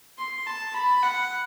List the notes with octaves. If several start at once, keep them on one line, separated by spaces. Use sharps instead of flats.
C6
A5
B5
F#5